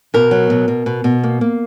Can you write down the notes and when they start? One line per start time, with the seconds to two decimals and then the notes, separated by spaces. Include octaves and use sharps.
0.14 B2 A#4
0.31 F#3
0.50 B2
0.68 B2
0.86 B2
1.04 B2
1.23 A#3
1.41 A#3